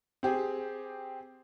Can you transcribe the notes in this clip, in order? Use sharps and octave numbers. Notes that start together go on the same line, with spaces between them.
C4 G4 G#4